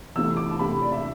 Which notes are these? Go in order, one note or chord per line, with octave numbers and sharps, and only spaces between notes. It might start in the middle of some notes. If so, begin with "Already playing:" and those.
E2 C3 E3 A3 E6
D6
A5
E2 C3 E3 A3 B5
D5
E5